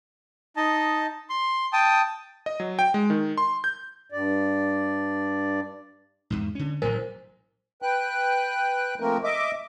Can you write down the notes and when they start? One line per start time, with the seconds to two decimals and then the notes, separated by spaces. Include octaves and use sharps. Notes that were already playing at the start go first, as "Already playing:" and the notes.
0.56 D#4 D#5 A5
1.30 C6
1.73 G5 A5 D#6
2.46 D#5
2.60 F#3
2.79 G5
2.94 G#3
3.10 D#3
3.38 C6
3.64 G6
4.12 G2 D5
6.30 E2 G#2
6.55 D3 C#4
6.82 A1 A2 F#3 A#4 C5 G#5
7.82 B4 G5 F#6
9.00 F3 A3 A#3 C4 A#4
9.24 D#5 E5 D6